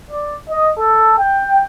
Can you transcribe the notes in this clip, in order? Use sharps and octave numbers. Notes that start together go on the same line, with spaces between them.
D5
D#5
A4
G5